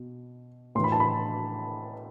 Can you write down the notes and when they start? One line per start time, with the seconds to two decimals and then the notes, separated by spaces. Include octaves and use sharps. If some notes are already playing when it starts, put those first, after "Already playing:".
Already playing: B2
0.75 A2 E3 C6
0.84 B5
0.92 A5
1.00 B5